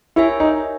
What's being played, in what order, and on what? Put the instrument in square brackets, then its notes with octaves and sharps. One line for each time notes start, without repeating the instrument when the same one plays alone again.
[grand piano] E4 [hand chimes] G4 A#4 C#5 E5 G#5
[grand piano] D#4